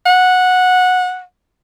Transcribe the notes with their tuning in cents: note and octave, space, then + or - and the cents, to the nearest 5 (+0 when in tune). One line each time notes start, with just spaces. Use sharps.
F#5 -15